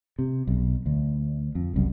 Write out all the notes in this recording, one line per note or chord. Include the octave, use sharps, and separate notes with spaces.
C3
B1
D2
F2
F#1 C2 F#2